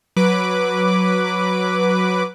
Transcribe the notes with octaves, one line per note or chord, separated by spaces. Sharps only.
F#3 B4 D6